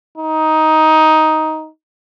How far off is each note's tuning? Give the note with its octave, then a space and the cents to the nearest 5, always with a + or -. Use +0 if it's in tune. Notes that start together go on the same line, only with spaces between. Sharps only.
D#4 +10